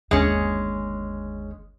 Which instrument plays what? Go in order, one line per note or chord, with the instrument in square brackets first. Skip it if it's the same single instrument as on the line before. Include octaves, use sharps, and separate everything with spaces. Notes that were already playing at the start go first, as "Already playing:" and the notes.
[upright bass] G1 D#2 [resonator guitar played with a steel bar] G#3 C#4